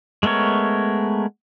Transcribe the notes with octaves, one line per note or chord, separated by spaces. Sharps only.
G#3 A3 B3 A#4 C#5